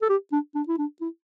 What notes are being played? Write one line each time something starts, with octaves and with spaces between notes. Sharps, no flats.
A4
G4
D4
D4
E4
D4
E4